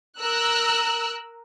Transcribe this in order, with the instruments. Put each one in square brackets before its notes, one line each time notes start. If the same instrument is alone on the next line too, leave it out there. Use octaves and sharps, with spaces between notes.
[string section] A#4 E6 F#6